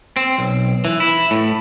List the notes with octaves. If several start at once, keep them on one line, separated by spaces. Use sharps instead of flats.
C4
B1
E3
E4
A2